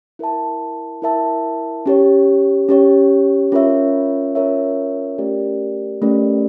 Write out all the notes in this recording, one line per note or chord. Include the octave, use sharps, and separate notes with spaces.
E4 A#4 E5 A5
E4 A#4 E5 A5
C#4 G4 C#5
C#4 G4 C#5
C#4 F4 A#4 C#5 E5
C#4 F4 A#4 C#5 E5
A3 C#4 G4 A#4 D5
A3 C#4 G4 A#4 D5